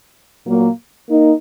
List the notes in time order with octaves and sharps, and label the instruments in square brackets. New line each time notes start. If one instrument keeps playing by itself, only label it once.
[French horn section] A#2 F#3 A#3
A#3 D#4